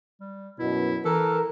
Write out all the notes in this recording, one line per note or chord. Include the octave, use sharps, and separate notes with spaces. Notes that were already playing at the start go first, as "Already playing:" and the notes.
G3
F#2 B2 E4
E3 A4 A#4